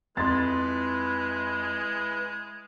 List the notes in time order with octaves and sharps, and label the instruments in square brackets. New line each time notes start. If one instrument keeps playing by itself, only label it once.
[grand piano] F2 [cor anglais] G#3 [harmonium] E4 B4 [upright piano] C6 A6